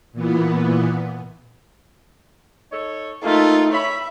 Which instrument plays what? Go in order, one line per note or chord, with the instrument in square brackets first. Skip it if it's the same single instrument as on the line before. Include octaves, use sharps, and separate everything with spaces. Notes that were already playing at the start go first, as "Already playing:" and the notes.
[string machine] A#2 E3 B3
[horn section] D#4 A4 C#5
[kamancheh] A3 D#4 [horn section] A#3 F4
[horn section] C#5 B5 [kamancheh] E5